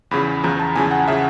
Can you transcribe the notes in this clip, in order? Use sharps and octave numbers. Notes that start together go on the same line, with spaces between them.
E2 C#3 F3 B5
E2 C#3 F3 A#5
A5
E2 C#3 F3 G#5
F#5
C#3 F3 E5